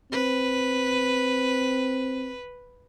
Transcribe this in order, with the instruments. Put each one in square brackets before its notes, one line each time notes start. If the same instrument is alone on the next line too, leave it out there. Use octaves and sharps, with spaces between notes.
[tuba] C4 [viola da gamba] B4